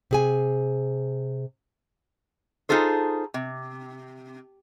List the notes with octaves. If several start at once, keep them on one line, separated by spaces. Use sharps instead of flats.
C3 G#4 G#5
D#4 F4 G#4 A4 C5
C3